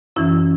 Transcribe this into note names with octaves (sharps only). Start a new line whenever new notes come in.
F#2 E3 C#4 E4